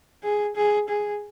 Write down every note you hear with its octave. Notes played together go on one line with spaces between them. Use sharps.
G#4
G#4
G#4